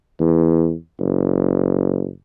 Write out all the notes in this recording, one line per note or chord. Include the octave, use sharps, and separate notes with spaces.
E2
F#1